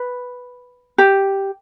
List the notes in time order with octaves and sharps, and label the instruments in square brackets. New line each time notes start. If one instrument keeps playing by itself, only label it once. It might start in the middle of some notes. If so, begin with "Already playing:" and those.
Already playing: [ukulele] B4
G4